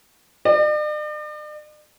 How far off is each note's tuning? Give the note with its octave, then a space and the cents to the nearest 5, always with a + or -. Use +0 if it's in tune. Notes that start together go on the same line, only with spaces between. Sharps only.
D5 +45